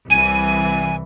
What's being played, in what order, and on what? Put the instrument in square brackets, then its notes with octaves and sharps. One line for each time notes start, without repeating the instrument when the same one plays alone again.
[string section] C2 E3 [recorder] G#5 [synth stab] D#7